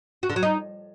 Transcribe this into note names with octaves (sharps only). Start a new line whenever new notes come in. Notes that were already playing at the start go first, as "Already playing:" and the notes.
F#4
D3
F#3
D#4